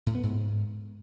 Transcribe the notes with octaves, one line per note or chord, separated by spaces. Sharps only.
A2
B3
G#2